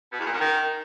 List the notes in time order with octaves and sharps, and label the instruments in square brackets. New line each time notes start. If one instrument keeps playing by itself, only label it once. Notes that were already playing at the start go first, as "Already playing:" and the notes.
[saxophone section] B2
E2
A#2
F#2
D#3